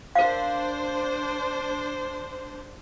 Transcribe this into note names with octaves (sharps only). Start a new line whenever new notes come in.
D4 A#4 C5 F5